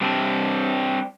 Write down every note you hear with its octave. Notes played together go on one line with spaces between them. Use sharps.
G3 C4 D4